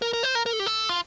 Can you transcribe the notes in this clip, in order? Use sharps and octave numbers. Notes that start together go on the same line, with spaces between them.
A#4
A#4
C5
A#4
A#4
A4
G4
A4
F4